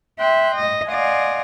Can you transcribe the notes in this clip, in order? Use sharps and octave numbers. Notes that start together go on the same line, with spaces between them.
E5 G5 C6 F#6
D#5
D5 D#5 F5 F#5 G#5 C6